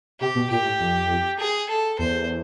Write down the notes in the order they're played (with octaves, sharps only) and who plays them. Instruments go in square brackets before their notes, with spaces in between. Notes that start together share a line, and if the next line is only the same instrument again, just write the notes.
[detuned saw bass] C3 [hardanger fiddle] G4
[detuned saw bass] B2
[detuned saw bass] A#2 [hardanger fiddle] G4
[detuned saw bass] A2
F2
[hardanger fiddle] G#4
A4
[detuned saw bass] E2 [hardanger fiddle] C5